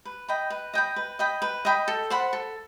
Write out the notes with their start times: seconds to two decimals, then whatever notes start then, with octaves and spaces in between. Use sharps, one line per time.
0.05 B4
0.28 D#5 G5 B5
0.50 B4
0.74 D#5 G5 B5
0.96 B4
1.19 D#5 G5 B5
1.42 B4
1.65 D#5 G5 B5
1.88 A4
2.10 C5 F#5 B5
2.33 A4